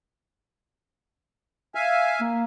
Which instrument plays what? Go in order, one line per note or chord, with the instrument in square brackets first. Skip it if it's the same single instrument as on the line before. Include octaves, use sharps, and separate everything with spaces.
[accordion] E5 F5 G#5
[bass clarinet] A#3